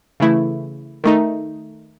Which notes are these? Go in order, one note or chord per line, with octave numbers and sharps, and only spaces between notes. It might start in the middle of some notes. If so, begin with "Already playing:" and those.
C#3 E3 A3 E4
D#3 A3 D#4